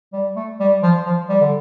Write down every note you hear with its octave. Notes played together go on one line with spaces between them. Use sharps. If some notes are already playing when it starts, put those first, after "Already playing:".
G3
A3
G3
F3
F3
G3
D3